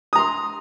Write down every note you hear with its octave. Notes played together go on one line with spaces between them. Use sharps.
A#5 C6 D#6